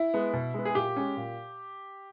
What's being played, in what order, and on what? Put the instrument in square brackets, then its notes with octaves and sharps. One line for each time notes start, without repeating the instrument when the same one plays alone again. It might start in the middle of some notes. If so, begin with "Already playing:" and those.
Already playing: [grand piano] E4
G#3 B3
B2
G#3 B3
G#4
A#2 G4
G#3 C#4
A#2